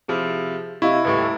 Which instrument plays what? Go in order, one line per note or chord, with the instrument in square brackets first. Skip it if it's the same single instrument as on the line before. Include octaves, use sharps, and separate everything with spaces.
[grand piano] C3 F3 E4 [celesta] G#4
[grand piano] C3 [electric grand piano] E4 [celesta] D#5 F5 C#6
[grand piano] D#1 A2 C#6 [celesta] G4 B4